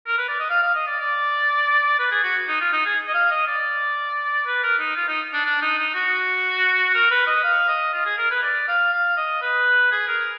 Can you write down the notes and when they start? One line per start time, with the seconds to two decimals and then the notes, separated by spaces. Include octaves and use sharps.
0.07 A#4
0.18 B4
0.28 D5
0.39 D#5
0.50 F5
0.62 F5
0.75 D#5
0.87 D5
1.00 D5
1.99 B4
2.11 G#4
2.23 F#4
2.48 D#4
2.61 F4
2.73 D#4
2.85 G#4
3.08 D#5
3.14 F5
3.31 D#5
3.47 D5
4.46 B4
4.63 A#4
4.79 D#4
4.96 F4
5.08 D#4
5.33 D4
5.45 D4
5.62 D#4
5.78 D#4
5.95 F#4
6.94 A#4
7.11 B4
7.27 D#5
7.44 F5
7.68 D#5
7.93 F4
8.06 G#4
8.18 A#4
8.31 B4
8.43 D5
8.68 F5
8.93 F5
9.17 D#5
9.42 B4
9.91 G#4
10.08 A#4